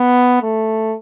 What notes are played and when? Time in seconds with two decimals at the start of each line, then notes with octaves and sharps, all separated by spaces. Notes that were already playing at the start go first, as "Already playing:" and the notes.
Already playing: B3
0.42 A3